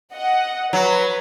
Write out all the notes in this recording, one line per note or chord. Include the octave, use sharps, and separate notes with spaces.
D#5 F#5
F#3 B4